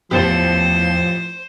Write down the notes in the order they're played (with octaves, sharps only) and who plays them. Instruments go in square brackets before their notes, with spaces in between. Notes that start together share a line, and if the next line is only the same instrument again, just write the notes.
[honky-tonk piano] A1 G4 [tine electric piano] E2 A5 [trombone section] F3 [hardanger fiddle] C5